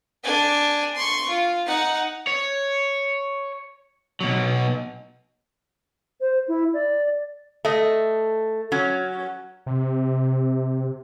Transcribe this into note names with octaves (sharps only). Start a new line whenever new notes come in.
D4 G#5
C6 C#6
F4
D#4 F#5
C#5
B2 F#3
C5
E4
D5
A3 D#5
F#3 C#4
C3